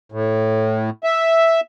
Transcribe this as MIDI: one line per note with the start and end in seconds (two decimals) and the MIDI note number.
0.12 0.90 45
1.04 1.61 76